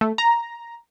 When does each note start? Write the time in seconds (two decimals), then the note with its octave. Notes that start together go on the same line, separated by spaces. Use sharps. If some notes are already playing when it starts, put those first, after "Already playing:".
0.01 A3
0.18 A#5